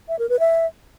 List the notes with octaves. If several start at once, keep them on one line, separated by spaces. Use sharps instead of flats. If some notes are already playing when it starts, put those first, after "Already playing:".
E5
A#4
B4
E5